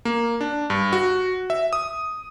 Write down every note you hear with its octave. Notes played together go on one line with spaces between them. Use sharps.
A#3
D4
G2
F#4
E5
D#6